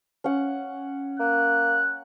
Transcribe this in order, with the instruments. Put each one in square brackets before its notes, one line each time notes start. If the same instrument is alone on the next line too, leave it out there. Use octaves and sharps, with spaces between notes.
[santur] C#4 F#5
[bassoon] A#3 [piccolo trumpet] F#6